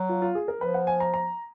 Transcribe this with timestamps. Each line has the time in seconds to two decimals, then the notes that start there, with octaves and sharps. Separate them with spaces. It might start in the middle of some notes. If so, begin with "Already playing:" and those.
Already playing: F#3
0.09 F4
0.22 F4
0.35 G#4
0.48 A#4
0.61 F3 B4
0.74 F#5
0.87 G#5
1.00 A#5
1.14 A#5